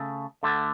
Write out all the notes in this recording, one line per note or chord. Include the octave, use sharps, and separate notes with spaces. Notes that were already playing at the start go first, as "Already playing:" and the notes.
Already playing: C#3 A3
D2 D3 A3